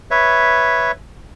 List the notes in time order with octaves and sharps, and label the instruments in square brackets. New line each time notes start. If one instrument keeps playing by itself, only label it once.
[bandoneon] B4 C#5 E5